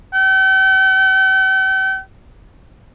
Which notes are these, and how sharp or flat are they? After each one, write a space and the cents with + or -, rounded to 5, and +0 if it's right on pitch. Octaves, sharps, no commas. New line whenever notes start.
G5 -45